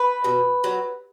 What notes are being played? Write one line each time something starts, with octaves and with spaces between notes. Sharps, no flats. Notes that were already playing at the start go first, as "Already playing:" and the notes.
Already playing: B4
B2
F#3